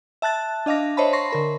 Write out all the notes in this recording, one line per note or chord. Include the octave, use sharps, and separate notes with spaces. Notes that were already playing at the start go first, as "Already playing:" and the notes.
E5 A5 F#6 A6
D4 D#5 F5 D6 A#6
C5 C#5 D#5 E5 A5 B5
C6 C#6 A#6 C7
D3 A#4 B5